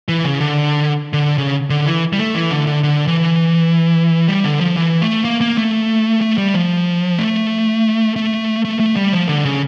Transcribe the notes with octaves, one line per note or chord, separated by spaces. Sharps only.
E3
C#3
D3
D3
C#3
D3
E3
G3
A3
E3
D3
D3
D3
E3
G3
D3
F3
E3
A3
A#3
A#3
A3
A3
G3
F3
A3
A3
A3
A3
G3
F3
D3
C#3